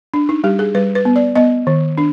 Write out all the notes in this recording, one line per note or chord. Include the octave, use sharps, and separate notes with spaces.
D4
D#4
G3 G4
G#4
G3 B4
B4
B3
D5
B3 D#5
D#3
D4